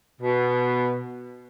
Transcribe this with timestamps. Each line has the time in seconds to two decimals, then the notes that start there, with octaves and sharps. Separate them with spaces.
0.20 B2